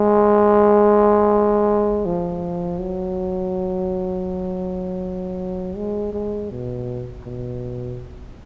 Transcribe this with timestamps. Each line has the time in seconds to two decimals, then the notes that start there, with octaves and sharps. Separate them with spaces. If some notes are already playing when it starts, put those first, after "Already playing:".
Already playing: G#3
2.05 F3
2.80 F#3
5.76 G#3
6.13 G#3
6.50 B2
7.24 B2